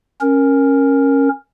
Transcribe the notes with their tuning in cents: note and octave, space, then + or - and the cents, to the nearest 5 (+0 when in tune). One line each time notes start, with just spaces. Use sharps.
C#4 -15 A#4 +5